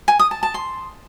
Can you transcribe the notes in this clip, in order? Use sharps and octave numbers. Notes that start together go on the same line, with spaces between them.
G#5
D#6
A5
A5
C6